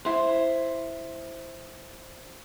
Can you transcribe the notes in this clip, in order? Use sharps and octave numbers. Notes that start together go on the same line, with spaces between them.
E4 C5